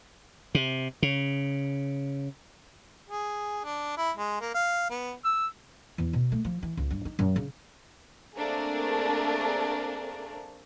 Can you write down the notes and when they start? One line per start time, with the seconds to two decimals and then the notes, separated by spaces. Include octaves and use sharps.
0.55 C3
1.02 C#3
3.09 G#4
3.64 D4
3.97 E4
4.17 G#3
4.41 A#3
4.54 F5
4.90 B3
5.25 E6
5.98 E2
6.13 B2
6.32 A3
6.45 F3
6.63 E3
6.77 C#2
6.90 G2
7.05 D#4
7.19 F#2
7.36 C#3
8.36 A3 A#3 C4 D4 G#4 A#4